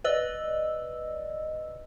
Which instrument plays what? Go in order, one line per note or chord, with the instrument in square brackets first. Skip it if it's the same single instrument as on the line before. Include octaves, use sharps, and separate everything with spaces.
[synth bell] B4 D5 D#5 E6